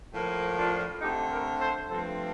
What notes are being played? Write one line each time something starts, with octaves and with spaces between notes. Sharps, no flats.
A2 F3 A#3
D4 F4
D3 A3 C4 D#4 G4
G4 A#4
A4 C5
G2 F3 A3 C4 A4 C5